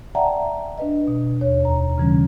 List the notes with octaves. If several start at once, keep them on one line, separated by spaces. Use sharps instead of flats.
D5 E5 F#5 G5 A5 A#5
D4 B4 D#5
B2
D#2 C#5
F2 A#5
C#3 E3 G3 C#4